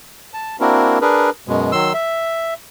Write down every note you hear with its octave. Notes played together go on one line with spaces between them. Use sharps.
A5
A#3 C4 D4 E4 F#4 A#4
D4 G#4 A#4 B4
F#2 B2 G#3
D#3 F#3 C6 E6
E5